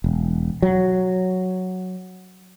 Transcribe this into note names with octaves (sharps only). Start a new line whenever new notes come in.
E1
F#3